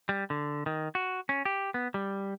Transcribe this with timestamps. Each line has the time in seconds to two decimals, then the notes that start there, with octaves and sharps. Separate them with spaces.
0.09 G3
0.30 D3
0.66 D#3
0.95 F#4
1.29 C#4
1.45 G4
1.74 B3
1.94 G3